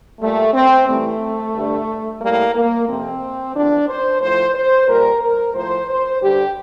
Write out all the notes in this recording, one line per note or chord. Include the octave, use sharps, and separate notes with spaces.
A#2 G3 A3
C4
A2 E3 G3 A3
G2 D3 G3
A2 G3 A#3
A#3
F2 C3 F3 C4
E2 D3 F3 D4
C5
A2 F3 C5
C5
A#2 G3 A#4
A#4
A2 F3 C5
C5
G2 D3 G3 G4